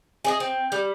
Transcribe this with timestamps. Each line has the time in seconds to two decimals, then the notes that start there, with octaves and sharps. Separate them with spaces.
0.24 G#4 D5 D#5
0.40 C4
0.72 G3